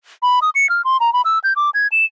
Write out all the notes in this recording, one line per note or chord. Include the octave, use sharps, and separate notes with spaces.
B5
D#6
C#7
F6
C6
A#5
B5
E6
G6
D6
G#6
E7